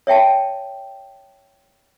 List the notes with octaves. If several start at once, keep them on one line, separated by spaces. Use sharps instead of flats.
C#5 E5 G5 A5